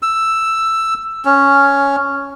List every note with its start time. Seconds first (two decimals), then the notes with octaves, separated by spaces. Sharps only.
0.02 E6
1.25 C#4